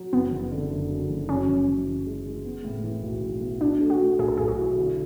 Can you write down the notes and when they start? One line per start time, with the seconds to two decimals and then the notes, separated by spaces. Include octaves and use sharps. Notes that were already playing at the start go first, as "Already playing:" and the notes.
Already playing: F#3
0.13 F#1 B3
0.32 F#1
0.52 D3
0.71 F#1
0.90 F#2
1.10 F#1
1.29 F#2 C#4
1.48 F#1
1.68 F#1
1.87 E3
2.06 G#3
2.25 G#3
2.45 B3
2.64 A2
2.84 E3
3.03 B1
3.22 E3
3.41 B3
3.61 B2 D4
3.81 A3
3.90 F#4
4.00 A3
4.19 B1 G#4
4.28 A4
4.37 B1 G#4
4.48 F#4
4.58 E4
4.77 D3